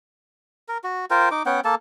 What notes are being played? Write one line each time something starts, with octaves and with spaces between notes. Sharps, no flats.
A#4
F#4
F4 A#4 C5 G5
D#4 D6
B3 C#4 F#5 G5
A#3 A4 A5